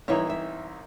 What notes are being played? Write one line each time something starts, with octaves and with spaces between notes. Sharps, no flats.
C2 E3 D#4 E4 G4 C#5
E5